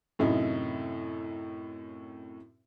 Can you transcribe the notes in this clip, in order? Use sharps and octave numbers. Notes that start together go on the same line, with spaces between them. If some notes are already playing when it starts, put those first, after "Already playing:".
F#2 A2 C3 D#4 E4